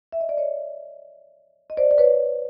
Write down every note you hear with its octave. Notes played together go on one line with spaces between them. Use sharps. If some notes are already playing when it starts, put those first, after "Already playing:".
E5
D#5
D5
C#5 D#5
D#5
C5 D5
D5
B4 C#5